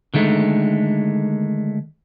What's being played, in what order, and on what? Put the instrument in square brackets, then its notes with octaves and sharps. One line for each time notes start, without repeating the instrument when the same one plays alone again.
[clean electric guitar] D3 D#3 G#3 A3